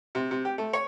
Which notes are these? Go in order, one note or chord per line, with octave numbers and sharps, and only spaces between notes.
C3
C3
G4
A3
C#5